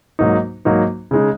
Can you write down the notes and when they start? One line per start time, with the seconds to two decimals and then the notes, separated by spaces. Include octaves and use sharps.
0.19 G#2 F#3 A#3 D#4
0.65 G#2 F#3 A#3 D#4
1.11 C#3 G#3 D#4